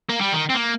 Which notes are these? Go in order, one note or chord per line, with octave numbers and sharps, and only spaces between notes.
A#3
G3
D#3
C4
A#3